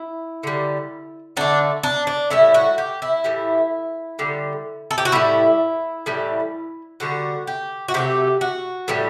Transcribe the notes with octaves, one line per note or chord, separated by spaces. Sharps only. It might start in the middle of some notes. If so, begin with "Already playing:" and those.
Already playing: E4
D3 G3
D3 A3 D4
D4
D4
A2 G3 E4
F#4
G4
E4
A2 E3 G3
D3 G3
A4
G4
F#4
A2 G3 E4
A2 E3 G3
D3 G3 F#4
G4
F#4
C3 F#3 A3 G4
F#4
A2 E3 G3